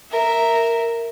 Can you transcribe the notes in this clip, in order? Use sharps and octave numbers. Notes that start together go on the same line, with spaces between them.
A#4 E5